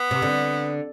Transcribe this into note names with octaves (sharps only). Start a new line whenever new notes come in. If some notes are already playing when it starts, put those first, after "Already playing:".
Already playing: B3
C3
D3